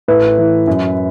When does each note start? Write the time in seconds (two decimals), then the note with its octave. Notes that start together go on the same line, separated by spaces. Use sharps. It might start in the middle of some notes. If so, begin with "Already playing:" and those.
0.08 A2 B4
0.38 E3
0.67 F#2